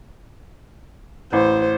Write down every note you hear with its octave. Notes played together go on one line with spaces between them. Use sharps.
A1 C5